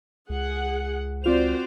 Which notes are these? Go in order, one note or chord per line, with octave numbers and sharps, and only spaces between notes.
C#2 G#4 F#5
C4 F4 F#4 C5 D5 F7